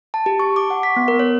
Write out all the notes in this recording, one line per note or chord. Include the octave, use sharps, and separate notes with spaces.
A5
G4
C#6
D6
F#5
B6
B3
A#4
C#5